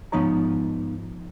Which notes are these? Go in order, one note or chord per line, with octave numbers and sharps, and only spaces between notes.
G#2 F3 B3 D#4 C#5 A#5